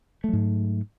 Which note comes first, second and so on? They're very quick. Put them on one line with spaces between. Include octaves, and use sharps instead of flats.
A3 F#3 G#2